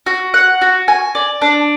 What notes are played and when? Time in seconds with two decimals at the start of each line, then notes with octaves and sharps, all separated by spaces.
0.06 F#4
0.34 F#5
0.62 F#4
0.88 G#5
1.15 D5
1.42 D4